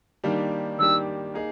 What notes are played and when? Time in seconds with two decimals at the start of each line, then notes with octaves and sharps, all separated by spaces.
0.24 D#3 G3 A#3 D4 G4
0.79 D#3 G3 A#3 D4 G4 E6
1.34 A#3 D#4 G#4